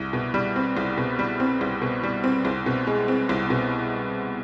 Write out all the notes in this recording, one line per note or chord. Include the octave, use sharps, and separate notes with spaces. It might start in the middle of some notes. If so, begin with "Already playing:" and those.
Already playing: C2
B2
G3
C4
C2
B2
G3
C4
C2
B2
G3
C4
C2
B2
G#3
C4
C2
B2